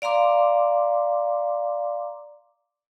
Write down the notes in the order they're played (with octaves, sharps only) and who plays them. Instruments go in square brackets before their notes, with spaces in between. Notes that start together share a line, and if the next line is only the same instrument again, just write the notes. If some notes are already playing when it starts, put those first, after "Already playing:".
[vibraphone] D5 F5 A#5 C6 D6